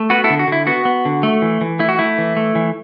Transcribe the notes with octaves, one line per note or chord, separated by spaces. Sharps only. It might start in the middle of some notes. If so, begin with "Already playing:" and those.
Already playing: A3
B3 F#4 B4
E4 A4
D3
F#4
D3 E4
B3 F#4
B3
D3
A3
E3
E3
A3 E4
F#4
A3 E4
E3
A3
E3